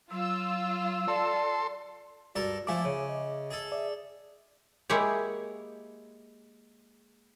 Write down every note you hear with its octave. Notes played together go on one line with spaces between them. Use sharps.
F#3 F4 E6
A4 D5 C6
G2 F#4 A4 A#4 D5
F3 A3 E4 E5 F5 G#5 D6
C#3 C#5
D#5
G#4 A4
D5 E5
G#3 A#3 E4 G4 G#4 C#5